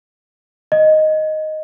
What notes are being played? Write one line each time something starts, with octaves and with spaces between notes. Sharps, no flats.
D#5